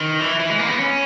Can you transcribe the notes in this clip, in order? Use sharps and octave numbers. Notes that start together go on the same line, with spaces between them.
D#3
E3
E3
G#3
A#3
B3
C#4